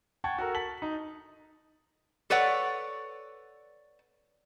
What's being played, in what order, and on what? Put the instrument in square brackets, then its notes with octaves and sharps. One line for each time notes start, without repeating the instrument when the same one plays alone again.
[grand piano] F#5 G5 A5 C#6 G#6 A6
F#4 A4 A#4
A5 A6 B6 F#7
D#4
[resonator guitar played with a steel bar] A4 B4 C#5 D5 F#5